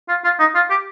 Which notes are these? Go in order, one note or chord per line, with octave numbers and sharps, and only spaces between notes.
F4
F4
D#4
F4
G4